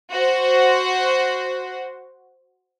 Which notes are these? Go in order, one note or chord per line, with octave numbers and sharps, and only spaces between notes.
F#4 C5